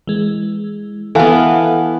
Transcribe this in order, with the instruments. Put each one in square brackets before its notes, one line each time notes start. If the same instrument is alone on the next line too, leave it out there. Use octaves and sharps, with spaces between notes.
[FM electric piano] E3 G#3
[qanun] E3 B3 [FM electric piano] A4 F5 F#5